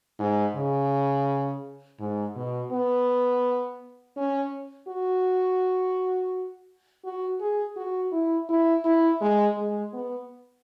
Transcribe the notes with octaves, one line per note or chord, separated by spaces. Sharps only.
G#2
C#3
G#2
B2
B3
C#4
F#4
F#4
G#4
F#4
E4
E4
E4
G#3
G#3
B3